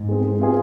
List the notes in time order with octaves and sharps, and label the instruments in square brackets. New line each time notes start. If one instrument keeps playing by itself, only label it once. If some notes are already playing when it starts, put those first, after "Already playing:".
Already playing: [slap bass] G#2
[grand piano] G#3 C4
G#3
C4 F4 G#4